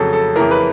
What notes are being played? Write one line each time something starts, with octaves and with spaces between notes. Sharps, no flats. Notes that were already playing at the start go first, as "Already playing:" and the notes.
Already playing: F2 C#3 F#3 A4
A4
F2 C#3 E3 A#4
B4